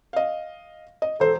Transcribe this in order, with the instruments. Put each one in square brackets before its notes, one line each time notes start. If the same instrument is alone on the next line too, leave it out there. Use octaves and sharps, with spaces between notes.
[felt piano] D#5 F5
D#5
[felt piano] E1 C5 [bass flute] A4